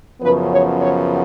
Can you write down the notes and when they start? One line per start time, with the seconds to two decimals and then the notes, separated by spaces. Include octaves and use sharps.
0.21 F#2 C#3 F3 B3 B4
0.52 C#5
0.81 C#5